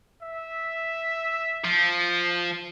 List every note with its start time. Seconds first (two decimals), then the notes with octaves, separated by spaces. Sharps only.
0.22 E5
1.64 F3